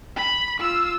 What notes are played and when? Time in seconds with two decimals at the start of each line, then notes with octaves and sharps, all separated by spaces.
0.16 B5
0.60 F4 E6